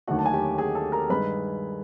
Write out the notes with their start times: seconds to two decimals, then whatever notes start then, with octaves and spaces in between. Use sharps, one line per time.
0.07 D#2 D3 F#3 A3 F#4 F#5
0.19 A5
0.26 G#5
0.33 G4 G5
0.58 G#4 G#5
0.75 A4 A5
0.92 A#4 A#5
1.09 G2 D#3 G#3 B4 B5